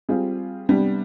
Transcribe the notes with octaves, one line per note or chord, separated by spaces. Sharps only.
G3 C4 F4 G#4
C3 G3 B3 D4